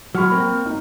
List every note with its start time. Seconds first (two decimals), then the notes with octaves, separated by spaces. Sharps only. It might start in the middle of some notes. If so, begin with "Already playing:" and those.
0.15 F#3 B5 C#6 F6
0.32 A#3 C4
0.66 D#4